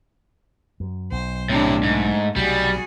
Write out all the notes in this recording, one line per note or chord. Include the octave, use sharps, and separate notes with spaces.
F#2
B1 C5
A2 C3 C4 D4
G#2 A3
B1 C3 G3 F#4 G#4